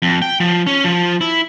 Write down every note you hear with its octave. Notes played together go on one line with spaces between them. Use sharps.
F2
G5
F3
C#4
F3
E4